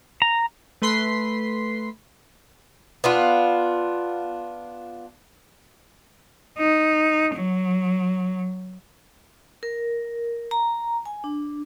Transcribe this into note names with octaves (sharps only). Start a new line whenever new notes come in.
A#5
A3 B4 C6 B6 C7
B3 D4 F4
D#4
F#3
A#4
A#5
G#5
D4